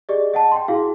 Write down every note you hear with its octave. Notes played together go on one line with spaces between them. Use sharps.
G4 G#4 D5 D#5
D#5 F#5 A5
G5 C6
E4 F#4 G#4 F5